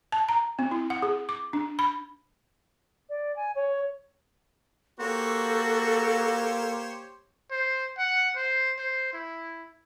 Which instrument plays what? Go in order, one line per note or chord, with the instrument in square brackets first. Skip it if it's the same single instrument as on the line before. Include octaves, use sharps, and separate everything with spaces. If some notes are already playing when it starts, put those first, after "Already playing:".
[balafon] A5
A#5
C4
E4
F#5
G#4
D6
D4
B5
[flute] D5
G#5
C#5
[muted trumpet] A#3 [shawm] F#4 [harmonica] G4 C5 C#5 [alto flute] A4
[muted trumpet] C5
F#5
C5
C5
E4